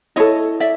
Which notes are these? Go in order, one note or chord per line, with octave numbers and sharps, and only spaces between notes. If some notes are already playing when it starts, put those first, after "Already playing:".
E4 A4 C#5 D#5
D5 E5